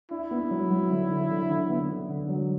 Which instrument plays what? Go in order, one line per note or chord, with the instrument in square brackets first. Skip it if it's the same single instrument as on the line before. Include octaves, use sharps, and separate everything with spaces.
[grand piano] D4 [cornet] E4
[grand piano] B3
F#3
F#3
D3
D3
D3
D3
B3
D3
D3
F#3